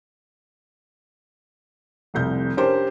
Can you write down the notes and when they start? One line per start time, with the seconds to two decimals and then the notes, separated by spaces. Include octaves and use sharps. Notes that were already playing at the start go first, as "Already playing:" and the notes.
2.14 F1 C2 G6
2.57 C#4 D4 G4 A#4 C5